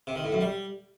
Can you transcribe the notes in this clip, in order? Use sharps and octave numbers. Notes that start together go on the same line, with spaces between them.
C3
D#3
A2
F#2
G3